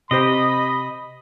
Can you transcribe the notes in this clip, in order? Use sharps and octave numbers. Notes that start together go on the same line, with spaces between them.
C3 G4 C5 D#5 B5